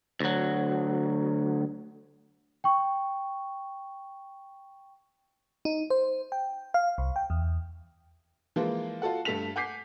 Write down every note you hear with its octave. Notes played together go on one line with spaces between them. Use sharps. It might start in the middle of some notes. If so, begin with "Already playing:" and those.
D2 F#3
G5 C#6
D#4
C5
G5
F5
C2
G5
E2
E3 F3 G#3 A#3 F4
F4 F#4 A4 F#5
G2 A3 A4 A5 B6 F7
F#5 G#5 D6 G6 B6 C7